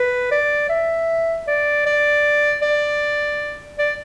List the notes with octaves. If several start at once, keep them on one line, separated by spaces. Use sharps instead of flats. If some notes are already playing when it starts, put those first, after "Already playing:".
Already playing: B4
D5
E5
D5
D5
D5
D5